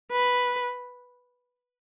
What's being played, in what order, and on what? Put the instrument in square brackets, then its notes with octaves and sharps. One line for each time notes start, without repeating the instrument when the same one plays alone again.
[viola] B4